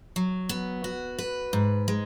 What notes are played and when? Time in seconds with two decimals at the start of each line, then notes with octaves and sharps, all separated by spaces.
0.16 F#3
0.49 B3
0.84 F#4
1.19 B4
1.53 G#2
1.88 G#3